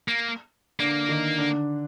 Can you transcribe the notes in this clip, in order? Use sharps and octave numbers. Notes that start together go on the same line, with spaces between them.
A#3
D3 A#3 D4
D#3 D#4
D3 D4